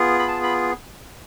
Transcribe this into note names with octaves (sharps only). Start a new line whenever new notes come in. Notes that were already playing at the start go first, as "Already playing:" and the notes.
Already playing: B3 F4 G#4
B5
A5
B5